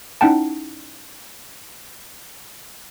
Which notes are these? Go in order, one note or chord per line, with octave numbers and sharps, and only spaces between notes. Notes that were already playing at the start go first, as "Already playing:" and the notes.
C#4 D#4 E4 F#5 G5 A5